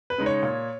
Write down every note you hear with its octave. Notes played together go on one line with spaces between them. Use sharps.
B4
C#3 G#3 D#4
C#5
A#2